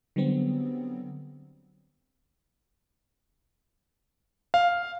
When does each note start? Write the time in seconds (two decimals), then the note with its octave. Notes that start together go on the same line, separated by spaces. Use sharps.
0.16 D3 F#3 G3 B3 C4
4.54 F5